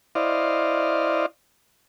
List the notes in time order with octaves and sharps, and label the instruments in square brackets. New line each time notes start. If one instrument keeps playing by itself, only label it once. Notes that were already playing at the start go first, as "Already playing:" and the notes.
[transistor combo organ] E4 C5 D5 D#5 F5